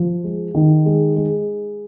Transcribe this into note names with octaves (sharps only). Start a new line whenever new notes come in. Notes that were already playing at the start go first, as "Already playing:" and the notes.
Already playing: F3
G#3
D#3
G#3
G#3